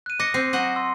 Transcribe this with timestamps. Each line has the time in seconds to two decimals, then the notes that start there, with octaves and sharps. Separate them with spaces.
0.06 F#6 D#7
0.20 D#5 D6 A#6 C#7
0.34 C4 C7
0.53 F#3 F#4 D#5
0.76 C6 E6